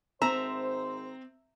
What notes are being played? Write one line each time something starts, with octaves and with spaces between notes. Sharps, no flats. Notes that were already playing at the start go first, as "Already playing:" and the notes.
G#1 C4 C5 E5 A#5